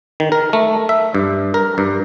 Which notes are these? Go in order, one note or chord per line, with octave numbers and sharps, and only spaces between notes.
D#3
A#4
A3
E5
G2
A#4
G2